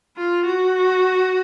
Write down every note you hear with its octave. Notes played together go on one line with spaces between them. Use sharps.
F4
F#4